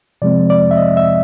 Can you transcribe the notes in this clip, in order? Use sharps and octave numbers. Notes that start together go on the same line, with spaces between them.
C3 F3 G#3 C4 D5
D5
E5
D#5
E5